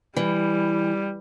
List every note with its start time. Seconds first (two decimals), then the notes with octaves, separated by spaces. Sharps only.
0.16 E3 G3